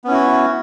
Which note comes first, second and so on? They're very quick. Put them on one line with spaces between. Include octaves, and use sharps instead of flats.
B3 C#4 E4 F#4